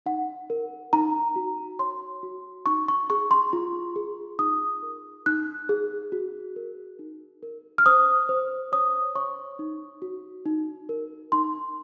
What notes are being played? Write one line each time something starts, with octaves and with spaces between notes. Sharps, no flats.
D#4 F#5
A#4
D#4 A#5
F#4
C#5 C6
F#4
D#4 C#6
C#6
G#4 C#6
C6
F4
G#4
D#4 D#6
A#4
D#4 F#6
G#4
F#4
A#4
D#4
A#4
F6
C5 D#6
C5
C#5 D#6
C#5 C#6
D#4
F#4
D#4
A#4
D#4 C6